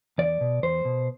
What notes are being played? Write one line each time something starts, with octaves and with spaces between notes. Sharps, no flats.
E2 D5
B2
E2 C5
B2